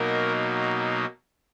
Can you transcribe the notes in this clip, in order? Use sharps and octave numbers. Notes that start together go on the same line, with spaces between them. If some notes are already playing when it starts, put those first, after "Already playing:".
Already playing: B2 F#3 A#3 D#4 A#4